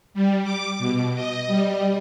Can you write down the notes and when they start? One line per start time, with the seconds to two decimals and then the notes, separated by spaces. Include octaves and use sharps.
0.14 G3
0.44 D6
0.79 B2
1.15 D#5
1.48 G3